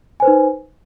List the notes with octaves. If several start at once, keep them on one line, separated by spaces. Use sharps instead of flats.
D#4 B4 C5 G#5